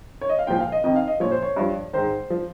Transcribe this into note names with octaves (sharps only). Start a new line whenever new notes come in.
C#5
D#5
F5
A#2 F3 G5
F5
D#5
F2 D#3 D#5
F5
D#5
A#2 F3 C#5
C5
C#5
G2 F3
G#2 D#3 C5
F3